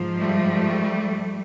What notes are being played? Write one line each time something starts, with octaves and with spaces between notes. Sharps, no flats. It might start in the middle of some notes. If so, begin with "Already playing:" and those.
Already playing: G#2 F3
G3 A3